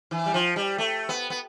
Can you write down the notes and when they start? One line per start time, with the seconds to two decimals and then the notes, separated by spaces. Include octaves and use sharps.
0.11 E3
0.26 G3
0.34 F3
0.56 G3
0.78 A3
1.09 B3
1.30 B3